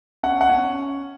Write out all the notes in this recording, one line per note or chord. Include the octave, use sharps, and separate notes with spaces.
C#4 F#5
F#5
C#4